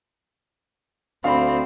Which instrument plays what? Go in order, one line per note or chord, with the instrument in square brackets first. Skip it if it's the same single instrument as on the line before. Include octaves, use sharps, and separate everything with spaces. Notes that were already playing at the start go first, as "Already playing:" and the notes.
[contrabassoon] D2 [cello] C4 [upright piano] F5 B5